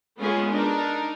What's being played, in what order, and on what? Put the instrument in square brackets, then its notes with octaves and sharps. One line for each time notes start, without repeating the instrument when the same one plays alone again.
[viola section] G#3 B3 C#4 F4 G#4
D4 D#4 A#4